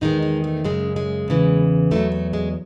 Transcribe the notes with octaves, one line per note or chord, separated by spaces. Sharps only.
E2 D#3 G#3 D#4
D#4
A3
F#2 C#3 G#3 C#4
G#3
E2 C#3 E3
E2 D#3 F#3 A3
A3
G#3